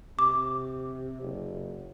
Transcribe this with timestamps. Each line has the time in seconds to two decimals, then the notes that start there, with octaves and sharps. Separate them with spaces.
0.19 C3 D6
1.22 F#1